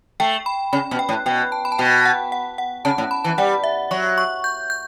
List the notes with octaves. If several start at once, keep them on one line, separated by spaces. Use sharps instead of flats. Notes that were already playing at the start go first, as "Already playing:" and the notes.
A3 G5
B5
C#3 B5
B2
G5
A2
B2 G5
A5
B5
A5
B2 G5
F#5
F#5
F#5
C#3 A5
A2
B5
E3 A5
G3 F#5
E5
F#3 C#6
C#6
G6
G6